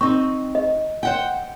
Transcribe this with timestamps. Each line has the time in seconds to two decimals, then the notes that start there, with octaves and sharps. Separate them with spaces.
0.01 C4 D#4 C#6
0.55 D#5
1.03 C5 F#5 G5